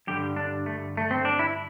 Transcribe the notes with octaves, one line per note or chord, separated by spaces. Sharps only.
G2 D3 G3 G4
D4
A3
A3
C4
D4
E4